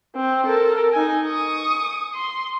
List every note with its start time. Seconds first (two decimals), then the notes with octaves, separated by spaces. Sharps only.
0.16 C4
0.46 A4 A#4
0.93 D#4 G#5
1.24 C#6 D#6
2.14 C6